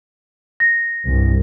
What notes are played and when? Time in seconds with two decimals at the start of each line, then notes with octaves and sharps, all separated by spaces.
0.60 A#6
1.06 C2 G2